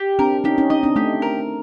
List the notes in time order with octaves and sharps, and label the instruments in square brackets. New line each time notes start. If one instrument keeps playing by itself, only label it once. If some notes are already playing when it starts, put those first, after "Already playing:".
Already playing: [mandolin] G4
[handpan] C4 D4 [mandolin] A#4
[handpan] C#4 D#4 [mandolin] G4
[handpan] C#4 D#4
[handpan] C#4 D#4 [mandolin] D#5
[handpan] C4 D4
[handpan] A3 [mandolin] G4
[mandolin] A#4